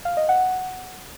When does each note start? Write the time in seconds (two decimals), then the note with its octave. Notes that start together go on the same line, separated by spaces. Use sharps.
0.05 F5
0.17 D#5
0.29 F#5